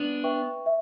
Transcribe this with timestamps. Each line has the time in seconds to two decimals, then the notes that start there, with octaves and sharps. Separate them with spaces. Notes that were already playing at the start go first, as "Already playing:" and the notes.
Already playing: B3 D4
0.24 B4 E5 G5 C#6
0.66 E5